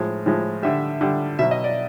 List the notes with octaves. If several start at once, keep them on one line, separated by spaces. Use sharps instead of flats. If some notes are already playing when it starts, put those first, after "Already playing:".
Already playing: A2 F3 G#3
A2 F3 G#3
D3 G3 E5
D3 G3
B2 F#3 E5
D#5
D5